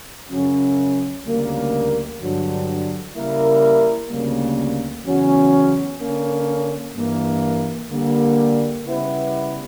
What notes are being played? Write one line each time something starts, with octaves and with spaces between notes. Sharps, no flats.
F#2 C#3 F#3 C#4
D2 C#3 G3 A#3
G2 D3 F#3
C#3 G3 A#3 E4 A#4
D2 C#3 G3 A#3
E2 C#3 F#3 C#4 F#4
D3 A#3 C#4
G2 E3 A#3
D3 G3 A#3
C#3 G3 B3 E4 B4